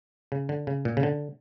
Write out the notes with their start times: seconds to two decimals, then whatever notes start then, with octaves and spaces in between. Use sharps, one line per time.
0.32 C#3
0.49 D3
0.67 C#3
0.85 A#2
0.97 C#3
1.03 D3